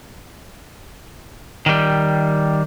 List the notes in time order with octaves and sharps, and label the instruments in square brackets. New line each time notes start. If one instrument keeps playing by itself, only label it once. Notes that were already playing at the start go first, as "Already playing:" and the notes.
[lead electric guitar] D#3 G3